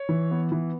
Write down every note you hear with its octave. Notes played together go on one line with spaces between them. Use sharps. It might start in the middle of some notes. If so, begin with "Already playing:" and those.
Already playing: C#5
E3
B3
E3